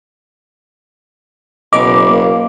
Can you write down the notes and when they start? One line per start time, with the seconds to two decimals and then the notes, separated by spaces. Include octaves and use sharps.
1.73 F#1 B2 D#5 D6
2.08 A#3